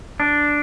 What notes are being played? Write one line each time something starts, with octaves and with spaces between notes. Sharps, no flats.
D4